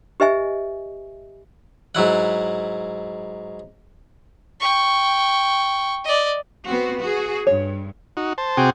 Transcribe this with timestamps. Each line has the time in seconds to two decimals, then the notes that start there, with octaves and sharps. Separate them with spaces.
0.20 G4 B4 D#5 E5 G#5
1.95 G#2 F#3 E4 F#5
4.60 G5 C#6
6.05 D5 D#5
6.65 B3 C4 F#4
7.01 F#4 G#4
7.47 G2 C#5
8.17 D#4 F#4
8.38 C5 A5
8.57 C3 C4 F#4 G#4 G5